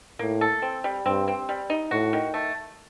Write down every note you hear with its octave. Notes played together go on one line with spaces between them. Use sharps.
A2 A#3
A4
C4
G3
G2 C4
C4
G3
D#4
A2 F#4
D#3
A3